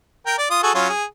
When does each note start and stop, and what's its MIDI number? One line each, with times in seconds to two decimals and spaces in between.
0.26 0.34 70
0.26 0.34 79
0.38 0.46 74
0.50 0.59 65
0.50 0.59 87
0.63 0.71 66
0.63 0.71 68
0.63 0.71 69
0.74 0.88 54
0.74 0.88 61
0.74 0.88 65
0.89 1.04 68